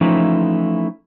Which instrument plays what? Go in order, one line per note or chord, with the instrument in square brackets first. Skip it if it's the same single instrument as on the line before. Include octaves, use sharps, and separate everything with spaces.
[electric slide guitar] E3 F3 A3 C#4 D#4 E4